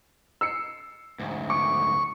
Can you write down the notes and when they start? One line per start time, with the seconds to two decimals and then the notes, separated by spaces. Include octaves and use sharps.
0.41 E6 C7 C#7
1.19 D2 G#2
1.50 C#6 D6